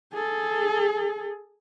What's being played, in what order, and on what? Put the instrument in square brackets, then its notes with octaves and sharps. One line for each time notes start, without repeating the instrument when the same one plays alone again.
[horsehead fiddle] G#4 A4